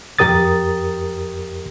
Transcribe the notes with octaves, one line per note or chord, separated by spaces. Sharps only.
F2 G4 A#4 D#6 A6